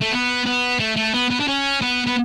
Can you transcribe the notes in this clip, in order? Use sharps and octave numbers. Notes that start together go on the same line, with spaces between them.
A3
B3
B3
A3
A3
B3
B3
D4
C#4
B3
B3